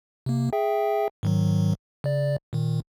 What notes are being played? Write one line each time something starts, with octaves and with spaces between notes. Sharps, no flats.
C3 A#3
G#4 E5 G5
G#2 D#3 F#3
C#3 D5
A#2 D#3